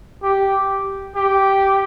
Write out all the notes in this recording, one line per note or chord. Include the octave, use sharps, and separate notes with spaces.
G4
G4